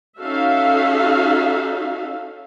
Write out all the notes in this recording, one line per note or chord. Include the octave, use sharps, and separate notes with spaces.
C#4 D#4 F#4 A4 E5 F5